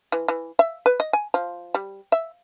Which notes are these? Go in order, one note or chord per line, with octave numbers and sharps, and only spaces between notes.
E3
E3
E5
B4
D#5
G#5
F3
G3
E5